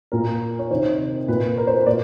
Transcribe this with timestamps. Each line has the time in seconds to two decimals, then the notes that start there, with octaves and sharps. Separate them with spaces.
0.12 A#2 A#4
0.59 C#5
0.71 C3 D#3 C5
1.28 A#2 B4
1.58 A#4
1.67 C5
1.87 A#2 D5